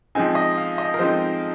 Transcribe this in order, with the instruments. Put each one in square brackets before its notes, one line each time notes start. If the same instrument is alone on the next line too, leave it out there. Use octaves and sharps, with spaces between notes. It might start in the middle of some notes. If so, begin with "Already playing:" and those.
[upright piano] F3 G#3 C4 D#4 G#5
D#5
F5
D#5
A#4
F3 G#3 C4 D#4 C5